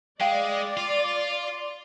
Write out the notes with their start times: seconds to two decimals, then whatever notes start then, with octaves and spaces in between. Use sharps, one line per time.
0.21 G#3 D5 F5 G5
0.77 F4